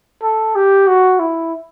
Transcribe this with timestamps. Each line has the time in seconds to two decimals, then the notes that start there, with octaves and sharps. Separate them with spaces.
0.23 A4
0.55 G4
0.87 F#4
1.19 E4